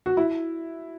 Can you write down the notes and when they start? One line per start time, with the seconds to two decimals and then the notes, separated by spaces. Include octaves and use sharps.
0.06 F#4
0.17 E4